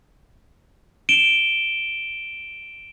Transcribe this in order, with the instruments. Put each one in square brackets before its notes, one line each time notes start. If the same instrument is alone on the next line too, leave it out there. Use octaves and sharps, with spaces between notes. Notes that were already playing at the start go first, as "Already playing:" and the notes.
[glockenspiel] D7 E7 G7